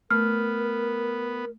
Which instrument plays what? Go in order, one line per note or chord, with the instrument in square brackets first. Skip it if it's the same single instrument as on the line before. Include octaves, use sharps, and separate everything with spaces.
[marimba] A3 [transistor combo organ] B3 [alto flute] A#4 [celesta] F6